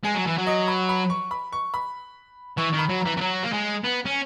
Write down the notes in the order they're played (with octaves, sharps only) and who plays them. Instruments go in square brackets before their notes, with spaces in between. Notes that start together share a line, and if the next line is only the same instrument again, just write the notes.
[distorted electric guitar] G#3 [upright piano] G#5
[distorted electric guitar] F#3
E3
F#3
[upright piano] D#5
B5
B5
C#6
B5
C#6
B5
[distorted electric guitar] E3 [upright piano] C#6
[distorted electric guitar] D#3
[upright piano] B5
[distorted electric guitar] F#3
[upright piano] A#5
[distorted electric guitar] E3
E3
F#3
A#3
G#3
B3
C#4